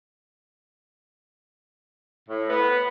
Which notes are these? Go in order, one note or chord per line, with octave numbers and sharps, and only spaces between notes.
A2
B3